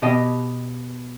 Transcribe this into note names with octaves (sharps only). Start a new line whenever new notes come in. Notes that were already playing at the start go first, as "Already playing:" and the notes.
B2 G4 D#5